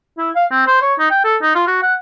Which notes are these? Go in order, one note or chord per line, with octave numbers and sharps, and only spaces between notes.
E4
F5
C4
C5
C#5
D#4
G5
A4
D#4
F4
F#4
F#5